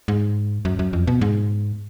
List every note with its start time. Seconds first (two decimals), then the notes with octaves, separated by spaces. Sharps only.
0.08 G#2
0.65 F#2
0.79 F#2
0.93 F2
1.07 B2
1.21 G#2